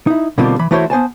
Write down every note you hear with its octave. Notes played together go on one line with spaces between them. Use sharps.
D#4 E4
B2 D3 G3 A#3 C4 F4
E3 B5
E3 A3 E4 F#4 C5 C#5
B3 C5 G#5 A5